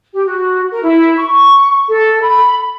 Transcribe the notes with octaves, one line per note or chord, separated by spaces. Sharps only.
G4
F#4
A#4
E4
C#6
A4
B5